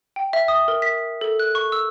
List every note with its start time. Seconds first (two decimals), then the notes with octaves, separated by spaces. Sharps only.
0.16 G5
0.33 E5
0.48 D#6
0.68 A#4
0.82 B6
1.21 A4
1.40 F#6
1.55 C#6
1.72 E6